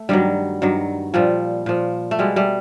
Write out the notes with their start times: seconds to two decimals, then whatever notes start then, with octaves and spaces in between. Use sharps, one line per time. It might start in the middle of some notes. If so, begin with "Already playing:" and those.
Already playing: A3
0.09 G2 D#3 F#3 G3
0.62 G2 D#3 F#3
1.14 A#2 F3 G3
1.66 A#2 F3
2.11 A3
2.19 B2 G3 G#3
2.36 G3 A3